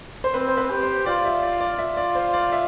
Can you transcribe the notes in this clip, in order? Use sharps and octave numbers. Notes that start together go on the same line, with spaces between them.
C5
C4 B4
C5
B4
G4
C5
F4 D5
E5
D5
D5
F4 E5
D5
C5
D5
E5